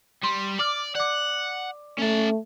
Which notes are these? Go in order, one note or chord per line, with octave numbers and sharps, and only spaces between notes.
G3 C6
D5 D6 F6
D5 F#5 D6
A3 C#4 A5